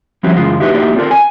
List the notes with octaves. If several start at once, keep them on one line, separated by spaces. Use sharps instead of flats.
F3 G3 C4 C#4 E4 F#4
F#2 C#3 E3 G#3 F4
D#4 E4 F#4 G4 B4
A#3 D#4 E4 F#4 G4 D5
C4 F4 A4 A#4 D5
G#5